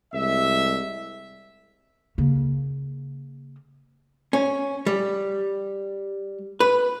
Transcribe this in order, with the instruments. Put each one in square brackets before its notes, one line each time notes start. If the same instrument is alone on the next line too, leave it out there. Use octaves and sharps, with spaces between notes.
[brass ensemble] C2 G#3 E5
[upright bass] C#3 A#3
[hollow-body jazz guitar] C#4
G3
B4